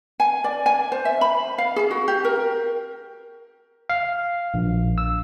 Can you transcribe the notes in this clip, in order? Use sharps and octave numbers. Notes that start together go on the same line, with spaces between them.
G#5
D5
G#5
C5
E5
B5
F5
G#4
F#4
G4
A#4
F5
A#1
E6